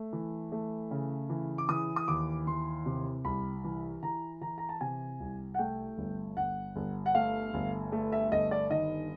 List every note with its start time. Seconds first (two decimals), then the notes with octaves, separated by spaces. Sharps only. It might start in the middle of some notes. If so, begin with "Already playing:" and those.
Already playing: A3
0.13 E3
0.52 A3
0.91 C#3
1.29 E3
1.58 D6
1.69 E3 D#6
1.96 D#6
2.08 D#2 D6
2.47 E3 C6
2.86 C3
3.25 C2 B5
3.64 E3
4.03 E3 A#5
4.41 E3 A#5
4.58 A#5
4.69 A5
4.81 C3 G#5
5.20 C2
5.54 F#5
5.58 A3 G5
5.98 G1
6.37 G1 F#5
6.76 G1
7.06 F#5
7.15 A3 F5
7.54 G1
7.92 A3
8.12 E5
8.32 G1 D#5
8.51 D5
8.71 D#3 D#5